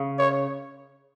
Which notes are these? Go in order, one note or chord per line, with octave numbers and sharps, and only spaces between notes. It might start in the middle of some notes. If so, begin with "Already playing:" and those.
Already playing: C#3
C#5